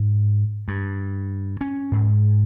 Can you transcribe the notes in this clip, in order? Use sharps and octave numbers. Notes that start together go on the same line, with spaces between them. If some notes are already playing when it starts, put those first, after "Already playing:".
Already playing: G#2
G2
C#4
G#2